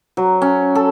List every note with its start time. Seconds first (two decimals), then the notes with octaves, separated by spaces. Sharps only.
0.17 F#3
0.42 C#4
0.75 A4